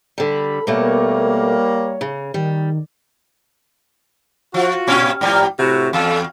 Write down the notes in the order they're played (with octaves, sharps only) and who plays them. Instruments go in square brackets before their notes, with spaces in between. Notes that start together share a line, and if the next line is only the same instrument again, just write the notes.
[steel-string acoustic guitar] D3 G3 [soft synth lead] B5
[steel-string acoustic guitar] B2 A3 [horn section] G3 A#3 [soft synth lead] C#5
[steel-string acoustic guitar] C#3
[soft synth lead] D#3 [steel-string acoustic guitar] G3
[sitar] F3 [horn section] F4 F#4
[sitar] G2 A#2 C#4
[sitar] G#2 G3 [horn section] F3 D5 A#5
[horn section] A2 C3 E4 [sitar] F#4
[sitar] E2 [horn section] A4 F5